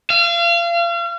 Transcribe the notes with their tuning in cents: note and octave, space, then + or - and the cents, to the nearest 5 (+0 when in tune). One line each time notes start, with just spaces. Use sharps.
F5 -35